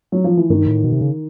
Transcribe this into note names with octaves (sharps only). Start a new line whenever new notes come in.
F#3
F3
E3
G2 D#3
A2
B2
C3
C#3